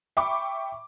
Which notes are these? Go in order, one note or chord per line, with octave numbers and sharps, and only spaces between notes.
E5 G5 B5 C#6 D6